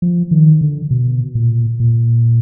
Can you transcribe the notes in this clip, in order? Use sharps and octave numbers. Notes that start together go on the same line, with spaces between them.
F3
D#3
D3
B2
A#2
A#2